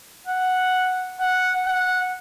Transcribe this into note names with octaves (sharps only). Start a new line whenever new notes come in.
F#5
F#5
F#5